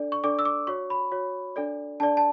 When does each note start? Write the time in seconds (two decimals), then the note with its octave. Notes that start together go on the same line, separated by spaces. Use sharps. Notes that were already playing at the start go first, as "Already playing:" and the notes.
Already playing: D4 A4 D5
0.12 C#6
0.24 D4 A4 D5 D6
0.39 E6
0.45 D6
0.67 F#4 C#5 C#6
0.90 B5
1.12 F#4 C#5
1.56 D4 A4 D5
2.00 D4 A4 D5 A5
2.17 A5